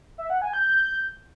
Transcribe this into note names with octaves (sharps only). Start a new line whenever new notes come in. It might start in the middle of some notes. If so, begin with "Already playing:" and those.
E5
F#5
G#5
G6